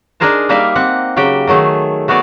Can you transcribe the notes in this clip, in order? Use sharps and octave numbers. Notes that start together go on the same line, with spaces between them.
D4 D#4 G#4 A#4 C5 A5
G3 A#3 D#4 D5 E5 F5
C4 F#5
C#3 F#3 G4 G5
D#3 F#3 A3 G#4
A3 B3 F#4 G#4 D5